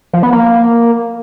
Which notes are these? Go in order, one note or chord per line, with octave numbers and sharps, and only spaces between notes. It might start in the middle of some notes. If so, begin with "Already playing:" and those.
F3
B3
A#3